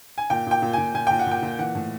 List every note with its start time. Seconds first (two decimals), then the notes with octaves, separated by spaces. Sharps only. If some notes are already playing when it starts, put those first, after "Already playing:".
0.18 G#5
0.30 A#2 G5
0.47 A#2 G5
0.62 A#2
0.73 A#2 G#5
0.94 A#2 G#5
1.07 A#2 G5
1.19 F#5
1.26 A#2 G5
1.42 A#2
1.59 E3 F#5
1.75 A2